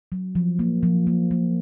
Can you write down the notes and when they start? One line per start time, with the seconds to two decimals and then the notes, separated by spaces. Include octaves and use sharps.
0.12 F#3
0.35 F3
0.59 A#3
0.83 F3
1.07 A#3
1.31 A#3